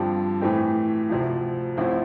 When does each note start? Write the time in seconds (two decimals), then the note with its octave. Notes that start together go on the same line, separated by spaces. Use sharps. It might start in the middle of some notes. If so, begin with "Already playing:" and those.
Already playing: G2 D3 F3 C4 G4
0.41 A2 E3 A3 C4 G4
1.09 D2 C3 F3
1.77 A1 A2 F3 C4 E4